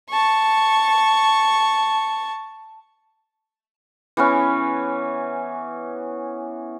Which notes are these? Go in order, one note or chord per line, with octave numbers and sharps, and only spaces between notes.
A5 C#6
E3 B3 C#4